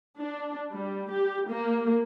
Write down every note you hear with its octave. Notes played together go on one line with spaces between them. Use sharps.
D4
G3
G4
A#3